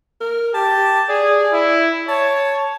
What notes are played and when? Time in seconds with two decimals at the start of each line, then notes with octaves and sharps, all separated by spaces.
0.21 A#4
0.54 G4 A5
1.09 G#4 D5
1.53 E4
2.08 C#5 A5